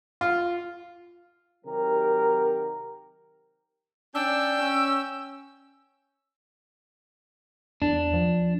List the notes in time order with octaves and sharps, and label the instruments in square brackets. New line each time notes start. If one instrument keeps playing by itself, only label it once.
[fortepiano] F4
[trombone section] C3 D#3 F#3 G4 A#4
[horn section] C#4 D4 [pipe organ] G5 [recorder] E6
[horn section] C#4
[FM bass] E2 [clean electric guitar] D4
[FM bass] F3